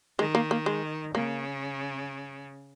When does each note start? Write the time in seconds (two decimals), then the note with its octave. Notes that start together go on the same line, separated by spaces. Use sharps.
0.18 D#3 G#3
0.35 A#3
0.51 A#3
0.66 G#3
1.15 C#3 A#3